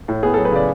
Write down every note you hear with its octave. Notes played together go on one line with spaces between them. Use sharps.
A2
B3 G#4
F#3 A4
B4
C#3 D5